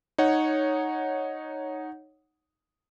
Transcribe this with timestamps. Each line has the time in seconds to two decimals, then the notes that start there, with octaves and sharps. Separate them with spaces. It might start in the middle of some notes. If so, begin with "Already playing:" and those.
0.18 D#4 C#5 F#5